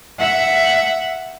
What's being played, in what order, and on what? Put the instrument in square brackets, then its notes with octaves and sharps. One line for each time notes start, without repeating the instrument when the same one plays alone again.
[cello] E5 F#5